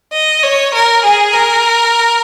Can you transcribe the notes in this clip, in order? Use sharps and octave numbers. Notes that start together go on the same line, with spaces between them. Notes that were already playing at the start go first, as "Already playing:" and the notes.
D#5
C#5
A#4
G#4
A#4